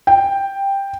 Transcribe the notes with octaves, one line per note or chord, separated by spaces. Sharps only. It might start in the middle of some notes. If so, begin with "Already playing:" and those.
G5